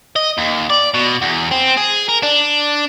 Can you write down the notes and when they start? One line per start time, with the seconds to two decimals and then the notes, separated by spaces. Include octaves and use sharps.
0.16 D#5
0.38 D#2
0.70 D5
0.94 B2
1.22 E2
1.51 C4
1.78 G#4
2.09 A#4
2.23 D4